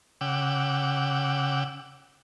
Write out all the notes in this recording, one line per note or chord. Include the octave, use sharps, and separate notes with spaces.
C#3 F#5 G5 D6 E6